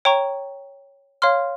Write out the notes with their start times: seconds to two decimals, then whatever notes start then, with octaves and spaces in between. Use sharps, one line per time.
0.05 C#5 G5 A#5 C#6
1.22 C#5 F5 C6 F6